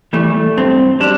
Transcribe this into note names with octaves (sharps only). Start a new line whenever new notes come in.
E3 G3 A3
G2 C4
G3 D4